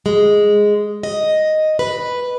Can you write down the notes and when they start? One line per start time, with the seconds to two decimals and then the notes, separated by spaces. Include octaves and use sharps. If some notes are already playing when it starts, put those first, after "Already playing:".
0.06 G#3
1.03 D#5
1.79 B4